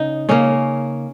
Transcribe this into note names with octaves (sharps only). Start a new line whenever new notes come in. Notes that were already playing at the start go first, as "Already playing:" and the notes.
Already playing: C#3 D#4
C#3 A#3 C#4